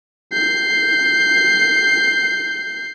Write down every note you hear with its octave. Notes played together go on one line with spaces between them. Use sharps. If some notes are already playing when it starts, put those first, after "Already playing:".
G6 C7